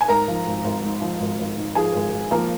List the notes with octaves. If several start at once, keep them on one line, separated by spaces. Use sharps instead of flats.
G#5
G#2 A#4 A#5
F3
G#1
G#1
G#2
F3
G#1
G#1
G#2
F3 G#4 G#5
G#1
G#1
F3 A#3 A#4